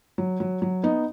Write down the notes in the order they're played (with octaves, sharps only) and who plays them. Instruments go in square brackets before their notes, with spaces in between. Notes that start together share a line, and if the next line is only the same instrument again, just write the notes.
[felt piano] F#3
F#3
F#3
B3 D#4